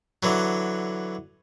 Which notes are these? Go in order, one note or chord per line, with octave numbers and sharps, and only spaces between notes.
D3 E3 F#3